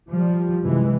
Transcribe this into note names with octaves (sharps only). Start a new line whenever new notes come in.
F3 G3
F#2 C3 E3 G#3